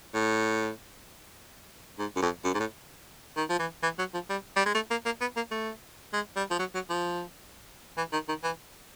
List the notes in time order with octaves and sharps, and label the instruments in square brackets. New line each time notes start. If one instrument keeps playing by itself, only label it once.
[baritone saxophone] A2
G#2
F#2
F2
F#2
G#2
A2
D#3
F3
E3
E3
F#3
F3
G3
G3
G#3
A3
A#3
A#3
B3
A#3
A3
G#3
G3
F3
F#3
F#3
F3
E3
D#3
D#3
E3